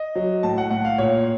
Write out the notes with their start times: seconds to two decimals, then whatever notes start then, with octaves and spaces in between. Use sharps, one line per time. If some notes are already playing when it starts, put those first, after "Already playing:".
Already playing: D#5
0.16 F#3
0.43 A2 A5
0.58 F#5
0.71 A2 F#5
0.85 F5
0.98 A#2 C#5